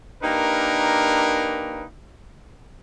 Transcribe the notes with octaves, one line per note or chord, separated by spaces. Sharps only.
A#3 D4 D#4 G4 A#4 B4